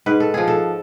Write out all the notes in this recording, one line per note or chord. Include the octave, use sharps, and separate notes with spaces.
G#2 B4
A4
F3 G#4
A4